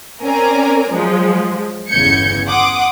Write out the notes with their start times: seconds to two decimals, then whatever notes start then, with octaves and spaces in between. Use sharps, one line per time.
0.21 C4 C#4 A#4 D5 G#5 A#5
0.93 F3 F#3 G#3
1.89 G1 E2 C#3 G6 G#6 C#7
2.47 F#5 C6 D6 D#6